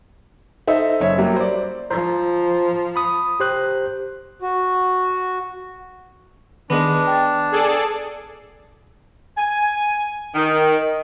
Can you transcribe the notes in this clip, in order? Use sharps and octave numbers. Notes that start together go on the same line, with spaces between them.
D#4 A4 C5 D#5 E5
F#1 C#5 E5
F#3 G3 A#3 F#4
C5 D5
F3 C5 A#5
B5 D#6
G4 C5 F#6
F#4
D#3 G#3 B3 D4
G5 A6
G#4 A4 D5
G#5
D#3